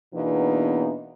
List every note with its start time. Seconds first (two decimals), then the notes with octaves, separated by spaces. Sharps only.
0.14 E2 B2 E3 A#3 D4 D#4